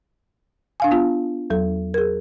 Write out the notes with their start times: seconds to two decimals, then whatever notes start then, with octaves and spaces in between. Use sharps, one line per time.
0.80 D4 F5 G#5
0.91 B3 F4
1.50 E2 F#3 A4
1.94 G#4 A#4